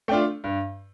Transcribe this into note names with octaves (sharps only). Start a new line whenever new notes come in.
A3 D4 F4 G5
G2